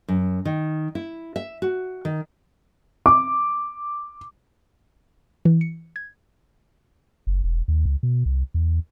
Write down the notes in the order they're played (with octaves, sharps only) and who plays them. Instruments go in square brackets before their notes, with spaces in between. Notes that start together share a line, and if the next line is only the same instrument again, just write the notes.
[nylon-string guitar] F#2
D#3
E4
E5
F#4
D#3
[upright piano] D6
[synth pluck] E3
C#7
G#6
[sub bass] F#1
E1
D#2
C#2
B2
C2
E2